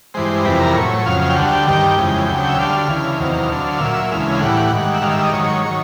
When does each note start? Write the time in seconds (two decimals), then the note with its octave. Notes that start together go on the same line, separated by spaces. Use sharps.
0.14 G2 E3 G#3 C5
0.44 F2 C3 E3 G3 B4
0.60 A#4
0.75 A2 F#3 C#5
1.06 F2 C#3 F#3 F5
1.21 F5
1.30 G5
1.36 D2 D3 G3 F#5
1.52 G5
1.67 G2 D#3 G3 G5
1.98 F2 C#3 E3 G#3
2.28 D2 C#3 F#3
2.49 E5
2.59 D2 D3 G3 F5
2.89 D2 C#3 E3
3.20 E2 C3 D#3 F#3
3.49 D2 D3 F#3
3.80 A#2 F#3 E5
4.11 D2 C#3 E3 G#3 F5
4.32 F5
4.41 A2 E3 G3 F#5
4.72 G#2 D#3 G3
4.94 E5
5.02 G#2 D#3 G3 F5
5.12 E5
5.23 D#5
5.33 G#2 D#3 F#3 C#5
5.65 D#3 F#3